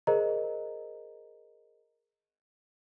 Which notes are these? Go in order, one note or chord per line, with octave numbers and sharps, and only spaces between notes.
G#4 A#4 C5 D#5 A#5